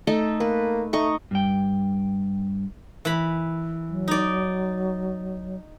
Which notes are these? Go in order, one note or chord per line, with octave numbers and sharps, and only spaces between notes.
A3 D#4 A4
A#3 B4
A3 D#4 D#5 C#6
G2 G5
E3 B5
F#3
D#4 D5